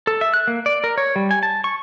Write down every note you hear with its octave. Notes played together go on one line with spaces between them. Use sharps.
A4
E5
F#6
A#3
D5
A#4
C#5
G3
G#5
A5
C#6